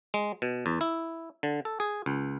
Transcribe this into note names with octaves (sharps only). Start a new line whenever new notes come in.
G#3
B2
E2
E4
D3
A4
G#4
C#2